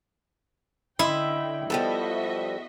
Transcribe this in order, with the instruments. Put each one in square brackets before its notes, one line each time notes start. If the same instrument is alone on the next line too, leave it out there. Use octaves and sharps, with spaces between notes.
[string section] D3 G5 [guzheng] E4 [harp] D#5 B5 C6
[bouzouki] F3 G3 A4 [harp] B3 [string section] F#4 D#5 E5